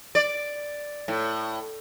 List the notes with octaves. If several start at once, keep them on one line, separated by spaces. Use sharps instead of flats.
D5
A2